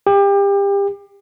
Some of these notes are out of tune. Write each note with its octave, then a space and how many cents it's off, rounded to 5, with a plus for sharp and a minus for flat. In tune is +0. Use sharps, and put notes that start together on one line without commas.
G4 +30